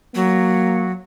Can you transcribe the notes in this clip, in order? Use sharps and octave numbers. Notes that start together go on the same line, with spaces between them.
F#3 A#3